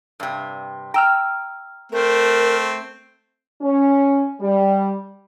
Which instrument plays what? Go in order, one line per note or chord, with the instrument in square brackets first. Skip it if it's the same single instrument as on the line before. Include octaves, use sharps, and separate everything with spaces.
[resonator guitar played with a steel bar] G2 C3
[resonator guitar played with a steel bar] G5 [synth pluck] A#5 E6 F6
[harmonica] A3 C4 [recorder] A#4
[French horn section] C#4
G3